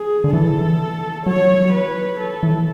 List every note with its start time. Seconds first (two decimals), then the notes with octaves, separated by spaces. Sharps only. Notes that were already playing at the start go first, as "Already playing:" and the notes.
Already playing: G#4
0.24 D3
0.33 E3 A4
1.26 F#3 C#5
1.73 B4
2.20 A4
2.43 E3